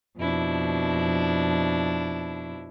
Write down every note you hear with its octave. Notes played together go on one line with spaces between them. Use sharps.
F2 B2 D4 E4